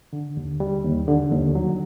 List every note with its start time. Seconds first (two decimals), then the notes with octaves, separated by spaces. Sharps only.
0.13 D3
0.37 D#2
0.60 G3
0.84 D#2
1.08 D3
1.32 D#2
1.55 F#3